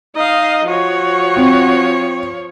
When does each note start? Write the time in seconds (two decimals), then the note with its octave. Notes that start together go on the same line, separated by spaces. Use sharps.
0.16 D#4 D#5 F5
0.67 F3 F#4 C#5
1.36 C4